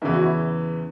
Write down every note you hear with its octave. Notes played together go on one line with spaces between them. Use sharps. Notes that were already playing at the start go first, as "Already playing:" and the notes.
E2 C#3 E3 E4
F#4
E4